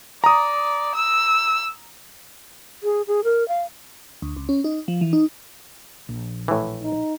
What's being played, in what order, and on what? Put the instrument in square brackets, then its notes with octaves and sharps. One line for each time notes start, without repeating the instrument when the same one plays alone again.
[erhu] D5 [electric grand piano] A#5 D#6
[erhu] E6
[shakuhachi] G#4
G#4
A#4
F5
[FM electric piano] D2
C#2
C#4
D#4
F3
E3
D#4
[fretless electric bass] A#1
[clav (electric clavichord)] A2 E3
[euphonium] D#4